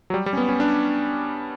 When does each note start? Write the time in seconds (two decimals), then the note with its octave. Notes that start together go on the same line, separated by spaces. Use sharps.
0.10 F#3
0.14 G3
0.26 G3
0.33 C#4
0.37 B3
0.49 C#4
0.60 D4